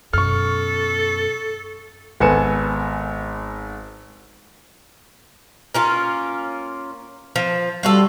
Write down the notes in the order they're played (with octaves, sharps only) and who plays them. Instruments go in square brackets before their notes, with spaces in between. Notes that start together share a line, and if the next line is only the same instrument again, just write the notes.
[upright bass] F#2 B2 [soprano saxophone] A4 [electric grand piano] C#6 F6
[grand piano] G#1 B3 A4 G#5 C#7 E7
[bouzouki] A#3 C#4 F4
F3
[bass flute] G3 [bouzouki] F4 F#4 A4